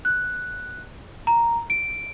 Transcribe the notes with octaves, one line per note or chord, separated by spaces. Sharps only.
F#6
A#5
D7